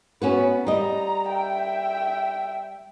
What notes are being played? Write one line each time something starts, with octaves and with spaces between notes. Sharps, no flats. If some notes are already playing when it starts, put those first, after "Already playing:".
B3 C#4 F#4 B4
G3 D#5 A#5
E5 G5